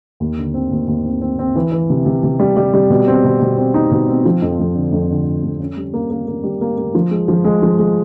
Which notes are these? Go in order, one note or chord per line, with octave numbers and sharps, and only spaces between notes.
D#2
D3
C4
D#2
D#2
C4
C4
C4
E3
E3
C3
C3
C3
G3
G3
G3
B2
C4
B2
B2
C4
D#4
B2
C4
F3
F2
F2
D3
F2
D3
D3
F2
C#4
G3
A#3
A#3
A#3
G3
A#3
A#3
F3
G#3
F3
G#3
F3
G#3